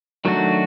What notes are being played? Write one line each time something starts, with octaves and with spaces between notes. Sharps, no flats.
D#3 F#3 A3 D4 F#4